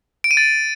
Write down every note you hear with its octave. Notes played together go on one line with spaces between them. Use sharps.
D7
D#7
A6